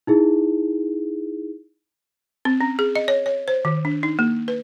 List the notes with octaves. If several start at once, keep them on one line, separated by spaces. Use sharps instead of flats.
D#4 E4 G#4
C4
C#4
G#4
D#5
C#5
C#5
C5
D#3
D4
D#4
A#3
B4